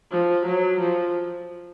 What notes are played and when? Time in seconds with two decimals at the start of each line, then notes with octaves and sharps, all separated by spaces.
0.11 F3
0.46 F#3
0.80 F3